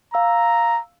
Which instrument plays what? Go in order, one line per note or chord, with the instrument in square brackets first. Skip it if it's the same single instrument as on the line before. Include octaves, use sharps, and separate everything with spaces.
[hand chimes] F5 E6 [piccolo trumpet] A#5